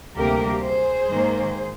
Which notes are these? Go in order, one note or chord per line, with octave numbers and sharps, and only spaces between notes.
D2 C3 G3 A#3 G4 A#4
G#4 C5
G#2 D#3 A#3